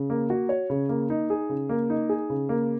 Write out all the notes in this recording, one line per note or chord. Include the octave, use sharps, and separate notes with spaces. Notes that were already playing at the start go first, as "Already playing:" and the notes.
Already playing: C#3
A#3
F#4
C#5
C#3
A#3
D#4
G#4
C#3
A#3
D#4
G#4
C#3
A#3